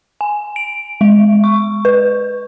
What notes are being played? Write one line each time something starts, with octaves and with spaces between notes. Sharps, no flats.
G#5
D7
G#3
C#6
B4